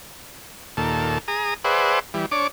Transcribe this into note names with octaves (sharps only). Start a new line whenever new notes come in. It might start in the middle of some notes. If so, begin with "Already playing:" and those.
D#2 A#2 A4
G#4 A#5 D#6
G#4 B4 C5 D5 E5 F#5
E3 G3
D4 C#5 D6